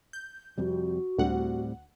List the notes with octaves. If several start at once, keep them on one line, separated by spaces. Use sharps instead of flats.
G6
F2 C3 G3 F#4
D2 A2 G3 C4 F#5